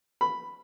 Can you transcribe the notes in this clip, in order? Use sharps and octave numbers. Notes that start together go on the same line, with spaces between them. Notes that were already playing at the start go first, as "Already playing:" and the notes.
B5